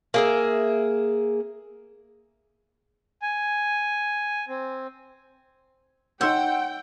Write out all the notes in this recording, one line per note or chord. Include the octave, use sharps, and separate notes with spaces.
A#3 G#4 E5
G#5
C4
D#4 C#5 F#5 G5 C6 E6 G6